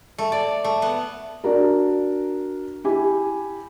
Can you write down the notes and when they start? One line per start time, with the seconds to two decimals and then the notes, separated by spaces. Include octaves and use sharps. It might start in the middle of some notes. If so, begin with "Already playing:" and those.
0.18 A3
0.32 D5
0.64 A3
0.82 B3
1.44 D4 F#4 A#4
2.84 E4 G4 G#5